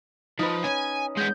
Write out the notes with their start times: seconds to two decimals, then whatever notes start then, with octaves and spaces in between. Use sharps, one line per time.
0.39 F3 D#4 B4
0.64 C#4 G#5
1.17 G#3 B3 G6